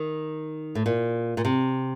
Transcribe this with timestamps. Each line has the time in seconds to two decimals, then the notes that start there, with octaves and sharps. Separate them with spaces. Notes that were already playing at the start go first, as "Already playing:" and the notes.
Already playing: D#3
0.75 A2
0.86 A#2
1.37 A#2
1.45 C3